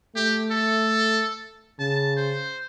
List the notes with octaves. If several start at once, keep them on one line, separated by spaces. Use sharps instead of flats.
A3 G4
A4
C#3 A5
C5